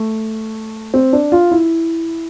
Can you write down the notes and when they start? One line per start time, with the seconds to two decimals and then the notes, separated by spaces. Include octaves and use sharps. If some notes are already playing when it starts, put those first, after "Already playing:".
Already playing: A3
0.94 C4
1.13 D4
1.32 F4
1.51 E4